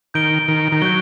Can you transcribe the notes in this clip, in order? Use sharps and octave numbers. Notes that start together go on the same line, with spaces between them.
D#3 G6 D7 G7
D#3
D#3
F#3 G6 D7 G7